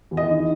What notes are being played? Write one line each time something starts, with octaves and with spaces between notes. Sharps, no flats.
E2
D#5
D#3